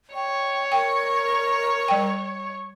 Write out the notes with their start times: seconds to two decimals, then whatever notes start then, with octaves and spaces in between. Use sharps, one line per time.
0.14 C#5 G5
0.72 A#4 G5
1.88 G3 G5